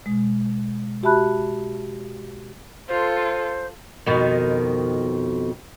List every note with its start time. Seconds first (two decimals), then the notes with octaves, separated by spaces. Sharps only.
0.06 B2 G#3
1.03 F#4 G4 E5 A5 B5 F#6
2.89 F4 A4 C5
4.06 F2 B2 D#3